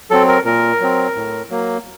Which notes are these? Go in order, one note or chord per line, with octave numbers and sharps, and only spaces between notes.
F#3 C4 A4
A#4
A#2 A#4
F#3 C4
A2
F#3 A#3